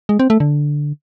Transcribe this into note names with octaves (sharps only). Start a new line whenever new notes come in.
G#3
C4
A3
D3